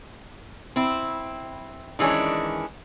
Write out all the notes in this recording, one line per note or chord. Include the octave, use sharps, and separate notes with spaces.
C4 E4
D#3 E3 G#3 C#4 D4